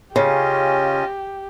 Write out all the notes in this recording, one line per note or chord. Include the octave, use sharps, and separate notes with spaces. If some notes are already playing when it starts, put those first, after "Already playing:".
C#3 C#4 F4 G4 D#5